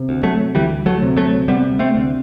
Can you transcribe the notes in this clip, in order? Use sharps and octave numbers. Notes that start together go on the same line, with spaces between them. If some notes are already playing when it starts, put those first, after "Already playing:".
Already playing: C3
D2
F#3 A3
D2 E3 G3
F#3 A3
C3
F#3 A3
C3 G3 B3
A3 C4
D2